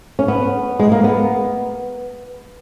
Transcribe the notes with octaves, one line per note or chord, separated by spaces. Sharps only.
C#4
B3
G#3
A#3
B3